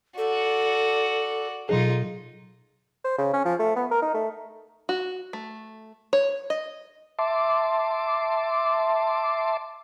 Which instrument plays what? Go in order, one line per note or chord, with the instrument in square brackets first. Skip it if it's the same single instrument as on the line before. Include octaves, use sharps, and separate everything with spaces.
[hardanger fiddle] F#4 D5 [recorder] A4
[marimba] B2 F#3 G#4 [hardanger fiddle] D#4 F4
[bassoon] C5
C#3
C#4
F3
A3
B3
A#4
D#4
A3
[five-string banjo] F#4
A3
C#5
D#5
[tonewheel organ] E5 A5 C6 D6